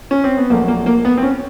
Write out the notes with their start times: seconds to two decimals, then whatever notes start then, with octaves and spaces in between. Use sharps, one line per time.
0.11 C#4
0.24 C4
0.37 B3
0.50 A#1 A#2 F#3 A3 A#3
0.68 A#3
0.86 A#3
1.05 B3
1.18 C4
1.23 C#4